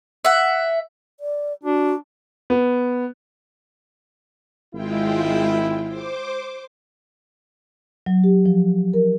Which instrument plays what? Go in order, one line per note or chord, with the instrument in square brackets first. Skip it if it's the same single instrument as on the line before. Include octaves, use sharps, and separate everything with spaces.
[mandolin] E5 F#5
[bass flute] D5
[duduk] D4 [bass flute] F#4
[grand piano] B3
[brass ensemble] G#1 E4 [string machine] G#3 F4 G5
[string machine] C5 D6
[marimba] F#3
G4
F3
A#4